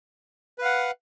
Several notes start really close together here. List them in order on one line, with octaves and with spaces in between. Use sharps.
B4 F5 F#5